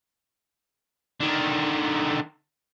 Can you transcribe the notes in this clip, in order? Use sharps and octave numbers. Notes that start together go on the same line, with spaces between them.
D3 D#3